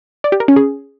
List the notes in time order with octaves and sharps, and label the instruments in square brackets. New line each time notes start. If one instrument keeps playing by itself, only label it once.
[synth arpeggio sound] D5
G4
A#4
C#4
G#4